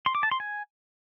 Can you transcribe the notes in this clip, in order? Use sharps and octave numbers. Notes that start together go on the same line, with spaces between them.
C6
D6
A5
C6
G#5